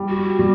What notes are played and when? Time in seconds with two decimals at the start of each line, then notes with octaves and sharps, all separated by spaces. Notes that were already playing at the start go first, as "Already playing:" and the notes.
Already playing: G3
0.09 F#4
0.39 G3